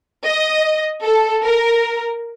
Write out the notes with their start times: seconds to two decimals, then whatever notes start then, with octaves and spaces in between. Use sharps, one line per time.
0.24 D#5
1.03 A4
1.44 A#4